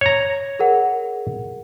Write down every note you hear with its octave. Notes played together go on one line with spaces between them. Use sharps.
C#5 A#5
G#4 A#4 F#5